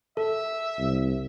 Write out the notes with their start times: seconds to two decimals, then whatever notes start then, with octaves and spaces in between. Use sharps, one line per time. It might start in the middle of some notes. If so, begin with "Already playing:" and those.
0.17 A4 E5
0.78 C2